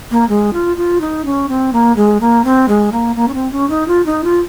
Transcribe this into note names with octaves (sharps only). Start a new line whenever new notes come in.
A#3
G#3
F4
F4
D#4
C#4
C4
A#3
G#3
A#3
C4
G#3
A#3
A#3
C#4
C4
C#4
D#4
F4
D#4
F4